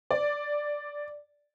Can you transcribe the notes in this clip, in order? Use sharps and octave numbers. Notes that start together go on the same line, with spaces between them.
D5